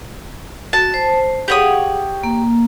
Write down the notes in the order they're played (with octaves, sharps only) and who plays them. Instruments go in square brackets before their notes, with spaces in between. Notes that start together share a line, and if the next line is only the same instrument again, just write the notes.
[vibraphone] F#4 [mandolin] A5
[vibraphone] C5
[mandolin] G4 C#5 D#6 [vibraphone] G#4 F5 F#5
[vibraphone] A#3